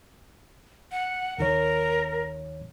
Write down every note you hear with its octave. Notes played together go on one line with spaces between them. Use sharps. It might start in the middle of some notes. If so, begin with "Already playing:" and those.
F#5
D#2 D#3 A#4 C#5